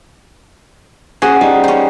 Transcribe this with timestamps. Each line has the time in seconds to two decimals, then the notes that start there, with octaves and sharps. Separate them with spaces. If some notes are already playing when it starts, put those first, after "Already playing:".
1.22 C#4 F#4 G#4 C5
1.41 G3 D#4
1.64 C#4 C5